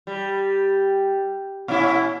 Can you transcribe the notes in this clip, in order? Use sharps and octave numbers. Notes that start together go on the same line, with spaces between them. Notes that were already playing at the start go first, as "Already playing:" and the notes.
G3
A#2 C#4 E4